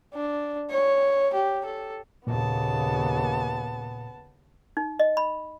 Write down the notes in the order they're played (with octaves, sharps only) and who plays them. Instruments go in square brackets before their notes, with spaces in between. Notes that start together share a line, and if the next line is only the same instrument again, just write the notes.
[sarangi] D4
C#5
G4
A4
[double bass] D#2 C#3 [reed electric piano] A#2 [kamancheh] B3 A5
[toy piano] D#4
D#5
B5